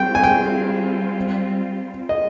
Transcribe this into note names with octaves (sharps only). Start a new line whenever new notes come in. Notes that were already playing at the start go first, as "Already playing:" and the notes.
Already playing: G3 C4 F4 G5
G#5
G5
D#5